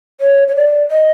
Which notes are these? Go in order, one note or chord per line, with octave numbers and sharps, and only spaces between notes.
C#5
C#5
D5
D#5